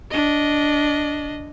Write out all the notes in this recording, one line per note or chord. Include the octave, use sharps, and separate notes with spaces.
D4 D#5